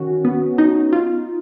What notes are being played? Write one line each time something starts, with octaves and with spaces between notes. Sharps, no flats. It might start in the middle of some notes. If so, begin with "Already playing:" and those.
Already playing: D#3 C#4 F#4
B3
D#4
F4